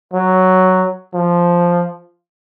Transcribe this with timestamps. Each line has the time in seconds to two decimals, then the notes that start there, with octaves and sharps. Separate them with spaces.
0.14 F#3
1.14 F3